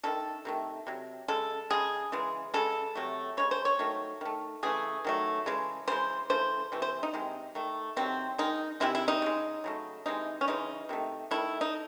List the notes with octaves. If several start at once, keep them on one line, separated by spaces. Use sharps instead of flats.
D#3 F#3 A3 A4
C3 D#3 A3
C3 F#3
C#3 G#3 A4
C#3 G#3 G#4
C#3 E3 G#3
C#3 G#3 A4
C3 F#3 A3
C#3 G#3 C#5
C5
C#5
D#3 F#3 A3
D#3 A3
C#3 E3 A3 G#4
D#3 F#3 A3
C#3 E3 G#3
C#3 E3 G#3 C5
C#3 E3 A3 C5
C3 E3 A3
C5
D#4
C3 D#3 G#3
D#3 A3
C3 D#3 F#3 C4
D#3 G#3 D#4
C3 D#3 G#3 E4
E4
D#4
C#3 G#3
C#3 F#3 A3
C3 E3 G#3 D#4
C#4
C#3 E3 G#3 D#4
C3 D#3 A3
D#3 A3 E4
D#4